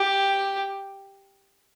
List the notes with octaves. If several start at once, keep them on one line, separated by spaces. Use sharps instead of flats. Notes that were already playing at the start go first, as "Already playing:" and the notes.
Already playing: G4